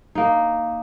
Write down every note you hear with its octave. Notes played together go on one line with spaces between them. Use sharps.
A#3 D#4